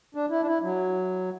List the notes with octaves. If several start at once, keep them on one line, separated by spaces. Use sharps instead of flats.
D4
E4
D4
E4
F#3